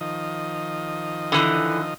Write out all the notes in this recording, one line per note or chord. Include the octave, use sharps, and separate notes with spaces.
D#3 F3 D#5
D3 E3